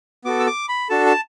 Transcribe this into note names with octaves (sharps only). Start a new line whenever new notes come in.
B3 F#4 A4 D6
E6
D6
B5
D4 F#4 A4 A5
A5